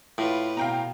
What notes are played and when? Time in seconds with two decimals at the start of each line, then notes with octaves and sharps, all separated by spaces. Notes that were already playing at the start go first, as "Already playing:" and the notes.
0.18 A2 F4 B4
0.57 B2 F5 G5 A#5